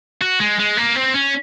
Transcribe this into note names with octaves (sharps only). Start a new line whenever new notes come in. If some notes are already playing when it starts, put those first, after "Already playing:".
F#4
G#3
G#3
A#3
C4
C#4